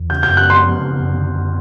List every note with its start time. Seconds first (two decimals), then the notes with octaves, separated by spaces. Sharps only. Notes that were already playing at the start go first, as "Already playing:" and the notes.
Already playing: E2
0.10 C#3 G6
0.23 F#2 G6
0.37 F#6
0.45 G#3 C6
0.64 F3
0.81 C#3
0.99 F#2
1.16 D3
1.34 F#2